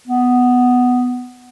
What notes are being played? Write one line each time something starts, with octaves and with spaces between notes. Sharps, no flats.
B3